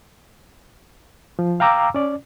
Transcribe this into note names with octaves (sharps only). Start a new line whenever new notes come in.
F3
F5 G5 A#5 D6 E6
C#4 D5